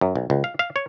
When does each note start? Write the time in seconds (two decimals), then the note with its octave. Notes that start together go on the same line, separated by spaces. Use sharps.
0.01 F#2
0.16 B1
0.30 C#2
0.44 F5
0.59 F5
0.76 C#5